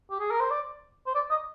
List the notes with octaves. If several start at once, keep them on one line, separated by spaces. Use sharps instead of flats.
G4
G#4
A#4
C5
D5
C5
D5
D#5